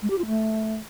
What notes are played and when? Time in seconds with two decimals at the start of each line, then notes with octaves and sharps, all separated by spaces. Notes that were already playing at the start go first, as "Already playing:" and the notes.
0.02 G#3
0.10 G4
0.18 F4
0.26 A3